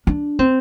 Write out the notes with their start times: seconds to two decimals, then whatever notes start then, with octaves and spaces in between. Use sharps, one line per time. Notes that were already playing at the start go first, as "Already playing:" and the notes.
0.07 D4
0.39 C4